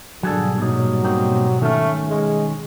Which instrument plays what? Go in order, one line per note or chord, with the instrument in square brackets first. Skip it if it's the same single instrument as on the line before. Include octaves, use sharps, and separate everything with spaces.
[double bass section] G#2 B2 G3 [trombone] D3 [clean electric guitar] F#3 G#4 A4
[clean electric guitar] A#2 D#4 [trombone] F#3
[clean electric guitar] A#3 C4 D#4
[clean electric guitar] D#3 C#4 [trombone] A3
[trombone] G#3